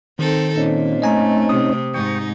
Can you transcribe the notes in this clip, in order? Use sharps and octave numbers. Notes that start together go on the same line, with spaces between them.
D#3 C4 D#4 A4
A#2 C4 C#4 D#4
A3 D#5 G#5 A#5
C3 D#6
G#2 D#4 G5 C#6